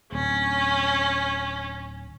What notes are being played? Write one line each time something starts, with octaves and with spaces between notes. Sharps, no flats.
D1 C#4